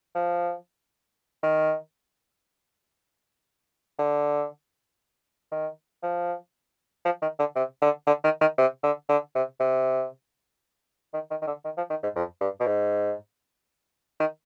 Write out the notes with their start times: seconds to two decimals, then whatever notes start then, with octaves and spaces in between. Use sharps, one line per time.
0.15 F3
1.43 D#3
3.99 D3
5.52 D#3
6.03 F3
7.05 F3
7.22 D#3
7.39 D3
7.55 C3
7.82 D3
8.07 D3
8.24 D#3
8.41 D#3
8.58 C3
8.83 D3
9.09 D3
9.35 C3
9.60 C3
11.14 D#3
11.31 D#3
11.42 D#3
11.47 D3
11.65 D#3
11.77 F3
11.90 D#3
12.03 G#2
12.16 F2
12.41 G2
12.60 B2
12.67 G#2
14.20 D#3